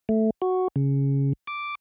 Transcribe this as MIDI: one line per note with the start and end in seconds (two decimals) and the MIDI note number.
0.09 0.30 57
0.42 0.68 66
0.76 1.33 49
1.47 1.75 86